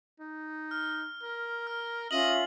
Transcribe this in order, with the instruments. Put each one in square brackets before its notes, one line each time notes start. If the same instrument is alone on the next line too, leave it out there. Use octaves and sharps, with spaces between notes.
[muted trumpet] D#4
[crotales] F6
[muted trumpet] A#4
[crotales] F6
[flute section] C#4 F4 E5 [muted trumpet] D#5 [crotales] F#7